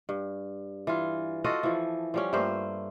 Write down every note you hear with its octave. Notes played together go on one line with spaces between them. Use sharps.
G2
E3 F4
F4 F#4 A4 D#5
E3 F3
F3 G3 C#4
G2 A3 A#3 C5